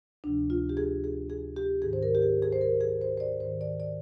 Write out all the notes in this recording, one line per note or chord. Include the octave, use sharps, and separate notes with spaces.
D2 C3 F3 D4
F4
G4
G#4
G#4
G#4
G4
G#2 D#3 G#4
C5
A#4
G4
G#4
G#4
C5
A#4
G#4
C5
C5
D5
G#2 D#3 C5
D5
D5